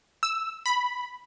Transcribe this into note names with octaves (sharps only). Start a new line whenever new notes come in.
E6
B5